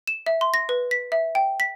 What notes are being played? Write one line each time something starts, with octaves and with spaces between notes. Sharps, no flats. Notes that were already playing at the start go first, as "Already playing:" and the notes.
E7
E5
C6
A#6
B4
B6
E5
G5
B6